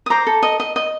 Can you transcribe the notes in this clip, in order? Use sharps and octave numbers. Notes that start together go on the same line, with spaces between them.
D#6
C5 A#5 D6
A4
D#5
D#5
D#5